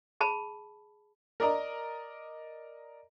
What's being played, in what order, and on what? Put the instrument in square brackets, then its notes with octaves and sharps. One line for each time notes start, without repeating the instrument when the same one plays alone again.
[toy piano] G#4 A5 B5
[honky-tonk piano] A#4 D5 D#5 A#5